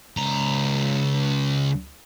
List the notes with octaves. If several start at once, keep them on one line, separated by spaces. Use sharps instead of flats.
C#2 A#5